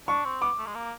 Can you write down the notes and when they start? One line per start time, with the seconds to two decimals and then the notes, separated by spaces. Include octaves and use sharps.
0.08 D4 C#6
0.25 C4
0.41 B3 D6
0.58 A3
0.67 G#3
0.75 A#3